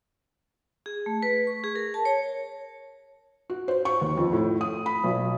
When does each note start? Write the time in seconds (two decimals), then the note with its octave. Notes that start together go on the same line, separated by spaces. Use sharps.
0.86 G#4
1.06 A3
1.23 B4
1.47 C#6
1.64 G#4
1.76 A#4
1.94 A5
2.05 C#5
3.50 F#4
3.68 C5
3.85 C#6
4.01 D#2
4.17 F2
4.33 A2
4.61 D#6
4.86 B5
5.04 B1